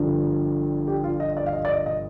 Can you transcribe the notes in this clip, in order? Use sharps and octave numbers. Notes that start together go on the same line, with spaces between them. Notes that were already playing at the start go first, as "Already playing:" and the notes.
Already playing: G1 G2 F3
G4
F4
D#5
D5
F5
D#5
D5
D#5
D#5